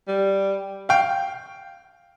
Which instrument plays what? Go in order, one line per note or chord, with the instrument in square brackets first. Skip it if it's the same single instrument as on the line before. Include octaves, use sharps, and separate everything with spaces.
[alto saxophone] G3
[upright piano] F5 G5